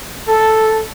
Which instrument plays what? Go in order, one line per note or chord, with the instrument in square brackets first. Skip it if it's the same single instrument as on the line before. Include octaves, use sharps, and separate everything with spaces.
[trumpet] A4